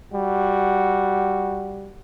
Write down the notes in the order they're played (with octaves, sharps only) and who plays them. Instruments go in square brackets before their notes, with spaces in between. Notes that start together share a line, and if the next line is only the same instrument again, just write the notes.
[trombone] G3 [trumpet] F#4